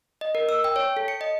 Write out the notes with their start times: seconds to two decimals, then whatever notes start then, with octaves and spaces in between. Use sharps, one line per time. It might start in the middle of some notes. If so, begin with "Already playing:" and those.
0.21 D#5
0.35 A#4
0.49 E6
0.64 G5
0.76 C#5
0.97 A4
1.08 C#7
1.21 D#5